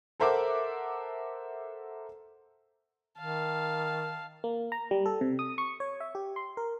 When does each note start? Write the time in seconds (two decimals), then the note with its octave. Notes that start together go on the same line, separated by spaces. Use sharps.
0.20 A4 A#4 C5 E5 F#5 D6
3.18 D#3 F5 A5
4.44 A#3
4.72 A#5
4.91 G3
5.06 A4
5.21 C3
5.39 D#6
5.58 C#6
5.80 C#5
6.00 E5
6.15 G4
6.36 C6
6.57 A#4